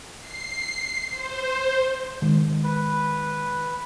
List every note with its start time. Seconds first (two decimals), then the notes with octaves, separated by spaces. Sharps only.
0.20 C7
1.08 C5
2.22 D#3 G#3
2.64 B4